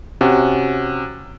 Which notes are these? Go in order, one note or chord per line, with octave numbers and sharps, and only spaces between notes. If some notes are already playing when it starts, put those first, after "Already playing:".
C3 C#4 F#4